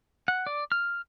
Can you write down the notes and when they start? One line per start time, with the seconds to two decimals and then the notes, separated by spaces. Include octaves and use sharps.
0.28 F#5
0.47 D5
0.72 F6